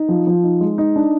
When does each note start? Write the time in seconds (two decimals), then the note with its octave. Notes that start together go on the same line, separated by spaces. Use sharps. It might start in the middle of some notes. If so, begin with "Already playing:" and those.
Already playing: D#4
0.09 F3
0.27 F3
0.43 D#4
0.61 G#3
0.78 D#4
0.96 D4